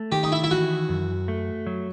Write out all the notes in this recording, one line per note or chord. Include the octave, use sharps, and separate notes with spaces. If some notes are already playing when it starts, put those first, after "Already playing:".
Already playing: A3
D#3 G4
D#4
E4
E4
E3 F#4
F#2
A3
F#3